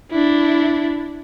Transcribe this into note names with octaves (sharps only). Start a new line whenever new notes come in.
D4 E4